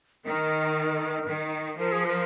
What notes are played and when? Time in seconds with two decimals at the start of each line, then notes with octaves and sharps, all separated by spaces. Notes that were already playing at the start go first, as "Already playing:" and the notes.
0.25 D#3 A#4
1.28 D#3
1.79 F3 A#4
1.92 G#4
2.05 C5
2.10 A#4